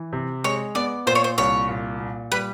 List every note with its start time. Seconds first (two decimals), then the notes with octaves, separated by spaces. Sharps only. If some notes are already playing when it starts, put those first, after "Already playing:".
Already playing: E3
0.13 C3
0.44 G#3 C#5
0.75 B3 D5
1.06 A#2 C5
1.15 C#5
1.24 C5
1.38 C2 C#5
1.69 A#2
2.00 A#2
2.31 G3 B4